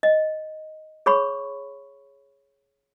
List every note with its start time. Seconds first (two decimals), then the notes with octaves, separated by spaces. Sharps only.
0.03 D#5
1.06 G#4 C#5 B5 C#6